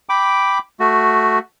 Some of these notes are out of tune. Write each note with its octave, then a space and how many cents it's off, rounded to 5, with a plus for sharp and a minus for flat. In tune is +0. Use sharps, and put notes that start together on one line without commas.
G5 +0 B5 +0 D6 +0
A3 +0 F#4 +0